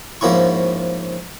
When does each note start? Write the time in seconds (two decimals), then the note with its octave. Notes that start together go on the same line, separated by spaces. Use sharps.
0.21 G#2 F3 A#3 C#4 E4 C#6